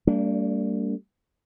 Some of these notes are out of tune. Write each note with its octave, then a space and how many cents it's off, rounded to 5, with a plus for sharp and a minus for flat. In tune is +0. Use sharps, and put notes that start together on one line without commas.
G3 +0 A#3 -40 D4 -35